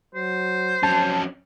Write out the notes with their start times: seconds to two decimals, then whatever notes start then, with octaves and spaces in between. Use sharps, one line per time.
0.15 F#3 C5
0.83 F2 F#3 C#4 A5